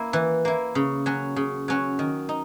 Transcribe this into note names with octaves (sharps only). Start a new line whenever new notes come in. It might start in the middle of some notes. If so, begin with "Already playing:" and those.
Already playing: A#3 E4
E3
A#3 E4
C#3
F#3 C#4 F#4
C#3
F#3 C#4 F#4
D#3
D#4